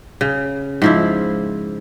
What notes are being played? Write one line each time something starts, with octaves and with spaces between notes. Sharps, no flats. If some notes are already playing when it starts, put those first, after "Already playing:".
C#3
G#2 F3 E4